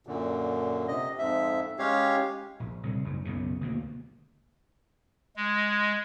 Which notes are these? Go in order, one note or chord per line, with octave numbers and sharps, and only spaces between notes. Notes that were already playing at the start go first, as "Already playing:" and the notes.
F#2 A#2 D3
C3 D#5
F2 G#2 E5
G#3 C#4 G4 C#5 F5
A#1
C2 C#3
F#1 G#2
B1 F#2 C#3
D2 B2 A#3
G#3